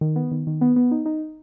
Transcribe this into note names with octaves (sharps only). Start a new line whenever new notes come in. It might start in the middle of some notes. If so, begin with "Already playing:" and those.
D#3
B3
D#3
D#3
B3
B3
D#4
D#4